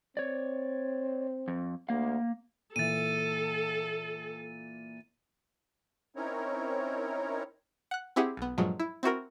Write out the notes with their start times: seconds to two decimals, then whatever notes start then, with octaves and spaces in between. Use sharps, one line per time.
0.17 C4 C#5 D5
1.48 F2
1.89 D2 A#3 F5
2.76 A#2 E3 A4 A6 D#7
6.16 C4 C#4 D#4 E4 A#4 C#5
7.91 F#5 F#6
8.16 C4 E4 G4 G#4 F#5
8.37 B1 B3
8.58 G2 A#2 F3 F#3 G#3
8.80 E4
9.03 C4 E4 F#4 A#4